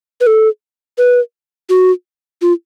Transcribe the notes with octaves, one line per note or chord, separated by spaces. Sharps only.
B4
A4
B4
F#4
F4